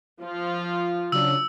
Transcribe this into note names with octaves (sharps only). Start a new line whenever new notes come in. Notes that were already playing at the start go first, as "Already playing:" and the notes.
F3 F4
C#3 F#3 D4 E6